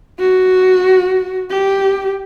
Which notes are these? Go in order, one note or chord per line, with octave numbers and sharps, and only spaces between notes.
F#4
G4